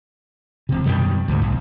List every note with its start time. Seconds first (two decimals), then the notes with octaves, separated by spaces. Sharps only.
0.69 E1 C3
0.85 F#2 B2 D#3 G3
1.28 D2 G#2
1.42 B1